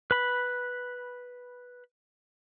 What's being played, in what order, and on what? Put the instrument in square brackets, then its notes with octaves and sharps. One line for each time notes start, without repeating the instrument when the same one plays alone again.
[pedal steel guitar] B4 B5